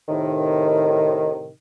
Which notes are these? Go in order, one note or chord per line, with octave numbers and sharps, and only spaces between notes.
A2 C3 D#3